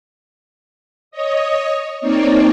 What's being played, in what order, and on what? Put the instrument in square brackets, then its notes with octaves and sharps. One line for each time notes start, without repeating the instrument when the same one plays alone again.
[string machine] C#5 D#5 D#6
A#3 C4 D#4 C#5 D5